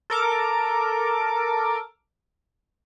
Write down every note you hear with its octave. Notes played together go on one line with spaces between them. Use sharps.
A4 A#4 D6